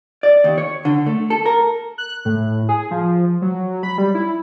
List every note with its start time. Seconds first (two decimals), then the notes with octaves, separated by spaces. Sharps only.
0.23 D5
0.44 D#2
0.58 C#5
0.85 D3
1.06 A3
1.30 A4
1.46 A#4
1.98 F#6
2.25 A2
2.69 G#4
2.91 F3
3.42 F#3
3.83 B5
3.98 G3
4.15 E4